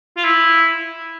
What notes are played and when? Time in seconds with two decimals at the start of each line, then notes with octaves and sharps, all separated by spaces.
0.17 F4
0.24 E4